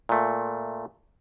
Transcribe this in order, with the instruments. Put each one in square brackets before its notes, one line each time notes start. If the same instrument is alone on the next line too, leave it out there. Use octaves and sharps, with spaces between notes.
[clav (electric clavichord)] A#2 A3